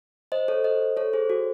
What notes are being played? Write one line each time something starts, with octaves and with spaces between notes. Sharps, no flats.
C5 D#5
A4 C#5
C5 D#5
A4 C#5
G#4 C5
F#4 A4